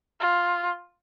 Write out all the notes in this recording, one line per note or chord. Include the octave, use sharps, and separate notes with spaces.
F4